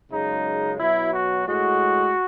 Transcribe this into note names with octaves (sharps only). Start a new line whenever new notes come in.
F#2 C#3 G#3 D#4
B2 F#3 E4
F#4
A2 G#3 F#4